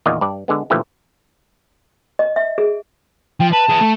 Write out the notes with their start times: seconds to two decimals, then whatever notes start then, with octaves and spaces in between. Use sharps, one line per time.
0.06 E2 A#2 D#3 D5 D#5 F5
0.21 G2 D5
0.48 D3 G#3 B3
0.70 A#2 D3 E3 F3 A3 G4
2.19 D#5
2.36 E5
2.58 G#4
3.40 F3 G5
3.52 B4 A5
3.69 B3 G#4
3.81 A3